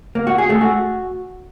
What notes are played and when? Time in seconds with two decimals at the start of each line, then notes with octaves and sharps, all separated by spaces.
0.15 A#3
0.27 F#4
0.38 G#4
0.50 A3
0.61 F#4